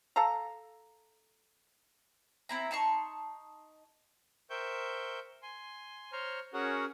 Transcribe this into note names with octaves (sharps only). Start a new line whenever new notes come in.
A4 F5 A5 A#5
C4 E4 A#5
D#4 A5 C6 C#6
A#4 C5 E5 G5 C#6 G6
G#5 C6
C5 C#5 A#5 C6 C#6 F6
C#4 F#4 G#4 A#4 C#5 F#5